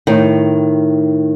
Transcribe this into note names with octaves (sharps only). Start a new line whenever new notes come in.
A2 D#3